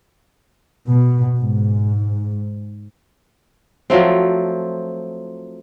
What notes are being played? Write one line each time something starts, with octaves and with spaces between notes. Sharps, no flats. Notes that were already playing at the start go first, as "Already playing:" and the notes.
B2
G#2
F3 F#3 A3 C4